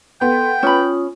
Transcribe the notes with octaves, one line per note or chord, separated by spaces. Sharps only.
B3 A4 G5 C6
C#4 F4 B5 D#6